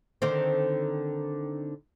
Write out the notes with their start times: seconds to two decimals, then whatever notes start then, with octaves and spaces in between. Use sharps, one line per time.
0.22 D3 D#3 C4